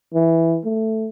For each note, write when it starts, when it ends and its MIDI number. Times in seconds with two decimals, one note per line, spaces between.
0.14 0.60 52
0.65 1.09 57